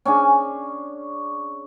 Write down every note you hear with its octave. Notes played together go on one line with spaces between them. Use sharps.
C#4 D4 G#4 G#5